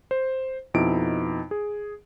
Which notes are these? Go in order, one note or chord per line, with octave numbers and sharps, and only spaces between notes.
C5
F2 B2 D#4 E4 D7
G#4